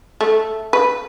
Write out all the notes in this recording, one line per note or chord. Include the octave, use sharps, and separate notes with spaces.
A3
B4